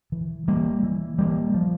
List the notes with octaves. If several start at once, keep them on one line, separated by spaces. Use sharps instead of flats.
E3
G3 A#3
E3
G3 A#3
F3